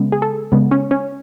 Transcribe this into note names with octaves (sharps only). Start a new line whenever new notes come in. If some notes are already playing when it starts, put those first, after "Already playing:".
Already playing: C#3 G#3 B3
G#4
A4
C#3 G#3 B3
C#4
C#4